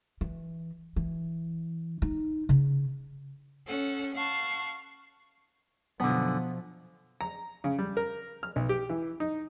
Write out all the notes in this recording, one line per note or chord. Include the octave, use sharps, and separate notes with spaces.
E3
E3
D#4
C#3
C#4 A4 F#5
F5 F#5 A5 C#6
F#2 B2 D3 F3 B3
A#5
C#3
G3
A#4
F6
B1
G4
E3
D#4